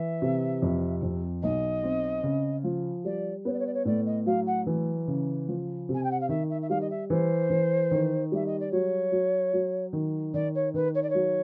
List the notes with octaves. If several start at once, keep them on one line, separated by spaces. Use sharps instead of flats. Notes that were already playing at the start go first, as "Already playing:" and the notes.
Already playing: E3 E5
C3
F2
F2
B1 D#5
C4
C#3
F3
G3 D5
B3 C#5
D5
C#5
D5
C#5
A2 D5
D#5
F#3 F5
F#5
E3
C#3
F3
C3
G#5
G5
F#5
F5
D#3 E5
E5
E5
G3 F5
D#5
E5
E3 C5
E3
D#3
G3 E5
D#5
D5
F#3 C#5
F#3
F#3
D#3
D#3 D5
C#5
D#3 B4
C#5
D5
C#5
F#3